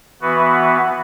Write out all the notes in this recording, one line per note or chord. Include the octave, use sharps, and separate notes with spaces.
E3 B3 F#4 B4